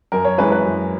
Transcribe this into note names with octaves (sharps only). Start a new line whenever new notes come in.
F#2 A#4
C#5
E3 G#3 C#4 B4
B4
F#2